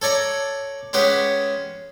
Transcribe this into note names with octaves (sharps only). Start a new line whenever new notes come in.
A4 C#5 D5 A#5
G#3 C#4 G4 B4 C#5 F#5